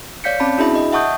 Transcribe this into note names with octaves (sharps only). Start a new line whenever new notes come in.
C#5 D5 F5 G6 B6 C#7
C4 C#4 A5 B5
D4 E4 F#4 G#4 E5 B5
D#5
E5 F#5 A5 C#6 D#6 G6